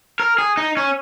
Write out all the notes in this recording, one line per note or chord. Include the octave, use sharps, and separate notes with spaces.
A#4
G#4
D#4
C#4